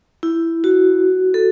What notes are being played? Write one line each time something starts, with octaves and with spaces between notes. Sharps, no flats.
E4
F#4
A4